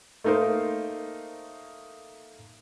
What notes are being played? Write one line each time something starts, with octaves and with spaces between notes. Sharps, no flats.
A3 A#3 D#4 A#4 C5